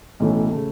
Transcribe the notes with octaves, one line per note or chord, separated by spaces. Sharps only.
B1 A2 E3 A3 C#4
C#3 A3